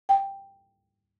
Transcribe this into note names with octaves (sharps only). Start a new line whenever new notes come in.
G5